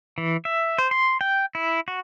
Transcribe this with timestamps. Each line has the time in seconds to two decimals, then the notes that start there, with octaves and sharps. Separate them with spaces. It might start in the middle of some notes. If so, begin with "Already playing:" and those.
0.18 E3
0.45 E5
0.78 C5
0.91 C6
1.21 G5
1.55 E4
1.88 F#4